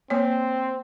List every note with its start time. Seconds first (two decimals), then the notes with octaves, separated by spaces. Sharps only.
0.10 A#3 C4 C#5